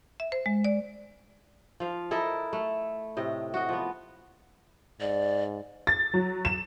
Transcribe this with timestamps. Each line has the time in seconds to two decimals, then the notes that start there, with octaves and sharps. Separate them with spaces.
0.20 E5
0.32 C5
0.46 G#3
0.65 D5
1.80 F3 F5
2.11 E4 A4 A#4 D#5
2.53 A3
3.17 A2 C3 D#5
3.54 F#4 D#5
3.69 F3 B3
5.00 G#2 D5
5.87 A6
6.14 F#3
6.45 E7